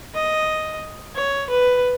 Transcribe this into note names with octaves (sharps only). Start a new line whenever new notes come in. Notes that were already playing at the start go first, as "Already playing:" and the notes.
D#5
C#5
B4